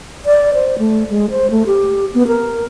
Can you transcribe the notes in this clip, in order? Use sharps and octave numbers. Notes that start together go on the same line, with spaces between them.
D5
C5
A3
G#3
C5
A3
G4
B3
A#4